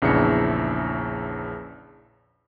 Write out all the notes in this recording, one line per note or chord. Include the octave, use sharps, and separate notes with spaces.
A#1 E2 C#3 D4 E4 C#7